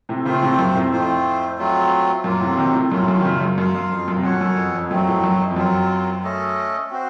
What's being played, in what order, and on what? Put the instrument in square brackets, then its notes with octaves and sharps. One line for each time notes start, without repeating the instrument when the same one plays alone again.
[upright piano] A2 C3
[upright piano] A#2 C#3 [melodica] A3 C4 F4 C5
[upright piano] A2 C3
F#2 A#2
A2 C3
[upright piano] F2 A2 [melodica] A3 C4 F4 C5
[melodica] F#3 A3 C4 F4
[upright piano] F#2 A#2 [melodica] F#3 A#3 F4
[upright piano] A2 C3
C3 D#3
A2 C3
[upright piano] F#2 A#2 [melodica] F#3 A3 C#4 F4
[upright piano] A2
F#2
D#3
A#2 C#3
F#2
[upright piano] F#2 [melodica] F4 A#4 F5
[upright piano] F#2
F2
F#2
C3
[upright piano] F#2 A#2 [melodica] C#4 A4 C#5 F#5
[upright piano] F#2
F2
F2
[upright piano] F#2 [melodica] F#3 A3 C4
[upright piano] F2 A2
F#2
F2
F2
[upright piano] F#2 [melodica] F#3 C4 F4 A#4
[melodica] A3 C#4 A4 D#5
C4 F#4 C5